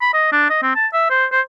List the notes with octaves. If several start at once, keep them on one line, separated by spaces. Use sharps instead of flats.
B5
D#5
D4
D#5
C4
A5
E5
C5
C5